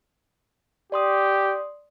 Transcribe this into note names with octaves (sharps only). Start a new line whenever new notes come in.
G4 D5 C6 D#6